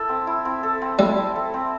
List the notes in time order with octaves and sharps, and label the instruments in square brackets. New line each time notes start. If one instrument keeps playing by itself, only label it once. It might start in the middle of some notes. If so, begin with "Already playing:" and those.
Already playing: [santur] E4 A4
C4
E4
C4
A4
C4
[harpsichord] G3 [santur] E4
[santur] C4
A4
C4